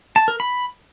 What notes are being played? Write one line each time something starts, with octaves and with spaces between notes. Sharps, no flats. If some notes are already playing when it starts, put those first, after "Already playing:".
A5
A#4
B5